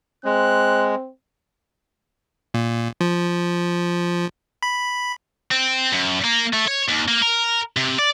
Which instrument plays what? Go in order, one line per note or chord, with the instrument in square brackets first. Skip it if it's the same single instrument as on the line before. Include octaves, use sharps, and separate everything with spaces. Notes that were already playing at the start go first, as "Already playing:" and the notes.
[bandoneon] G#3 [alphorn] C4 [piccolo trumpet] F#6
[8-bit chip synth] A#2
F3
B5
[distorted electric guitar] C4
F#2
A#3
A3
C#5
D#2
A#3
A#4
C3
D5